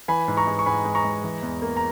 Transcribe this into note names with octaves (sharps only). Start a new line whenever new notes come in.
E3 G#5 B5
G#2
A#5 C#6
G#3
C#6
G#2 G#5 B5
G#3
A#5 C#6
G#3
E3
E2
A#3
A#5